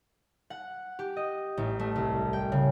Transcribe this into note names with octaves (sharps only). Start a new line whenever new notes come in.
F#5
G4
D#5
A1
A3
C2
G5
C#3